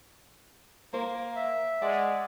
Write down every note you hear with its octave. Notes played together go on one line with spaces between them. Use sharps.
A#3 C5
E5
G#3 D5 F#5